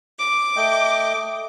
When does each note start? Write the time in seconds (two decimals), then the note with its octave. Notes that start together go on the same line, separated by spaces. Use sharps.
0.19 D6
0.57 A3 D#5 G5